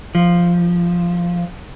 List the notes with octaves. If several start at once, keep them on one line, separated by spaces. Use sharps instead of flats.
F3